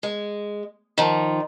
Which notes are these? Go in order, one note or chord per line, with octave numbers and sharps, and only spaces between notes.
G#3
D#3 F3